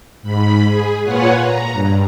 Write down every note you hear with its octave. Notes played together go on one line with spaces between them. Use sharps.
G#2 B5
G#4
A#2 F4 B4 C#5 F#5 G#5
A#5
G2